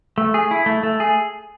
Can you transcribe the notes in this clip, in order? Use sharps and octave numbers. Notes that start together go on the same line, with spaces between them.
A3
G#4
E4
A3
A3
G#4